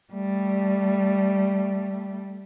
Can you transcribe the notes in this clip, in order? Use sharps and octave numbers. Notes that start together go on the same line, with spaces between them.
G3 A3